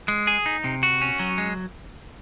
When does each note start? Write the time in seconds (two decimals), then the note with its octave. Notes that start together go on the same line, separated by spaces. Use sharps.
0.08 G#3
0.27 G#4
0.46 D#4
0.64 C3
0.83 F#4
1.02 C#4
1.19 F#3
1.38 G#3